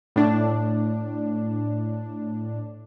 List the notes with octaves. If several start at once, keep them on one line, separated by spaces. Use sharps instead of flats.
A2 D4